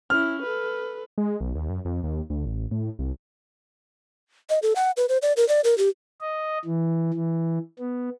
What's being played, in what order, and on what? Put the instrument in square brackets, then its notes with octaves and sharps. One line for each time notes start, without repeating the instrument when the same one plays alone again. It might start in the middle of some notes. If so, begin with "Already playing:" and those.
[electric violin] C#4 E4 [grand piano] F6
[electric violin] A4 B4
[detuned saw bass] G#3
B1
D#2
F#2
F2
D#2
D2
A1
A2
C2
[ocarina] D#5
A4
F#5
B4
C5
D5
A#4
D5
A#4
G4
[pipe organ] D#5
E3
E3
B3